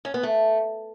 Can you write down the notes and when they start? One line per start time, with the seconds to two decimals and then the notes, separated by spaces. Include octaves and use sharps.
0.05 C#4
0.14 B3
0.23 A3